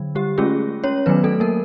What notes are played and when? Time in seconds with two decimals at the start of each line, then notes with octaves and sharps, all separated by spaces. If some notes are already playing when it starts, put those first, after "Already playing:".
Already playing: D3 F#3
0.15 G3 G4
0.38 G#3 A3 C#4 F4 G#4
0.84 C#4 C#5
1.06 D#3 F#3 A3 B3 B4
1.23 A3 A4
1.40 A#3 A#4